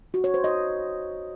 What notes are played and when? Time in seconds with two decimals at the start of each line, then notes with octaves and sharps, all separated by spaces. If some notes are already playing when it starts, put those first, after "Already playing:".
0.14 F#4
0.24 C#5
0.34 C5
0.44 D#5